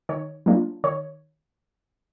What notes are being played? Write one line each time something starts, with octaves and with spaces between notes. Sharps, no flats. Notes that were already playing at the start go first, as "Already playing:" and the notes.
D#3 C#5
F#3 A#3 D4 F4
D#3 C#5